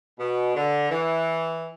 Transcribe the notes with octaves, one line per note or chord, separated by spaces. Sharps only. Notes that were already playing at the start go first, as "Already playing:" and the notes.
B2
D3
E3